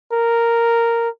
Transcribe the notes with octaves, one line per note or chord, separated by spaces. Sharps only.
A#4